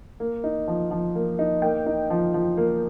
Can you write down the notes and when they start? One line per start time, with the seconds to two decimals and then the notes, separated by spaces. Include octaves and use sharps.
0.20 A#3
0.44 D#4
0.68 F3
0.91 F3
1.15 A#3
1.39 D#4
1.62 A#3 G5
1.86 D#4
2.10 F3
2.34 F3
2.57 A#3